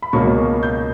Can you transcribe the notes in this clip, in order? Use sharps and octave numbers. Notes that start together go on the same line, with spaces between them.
B5
C#2 B2 A#3 C#4 C#6
G6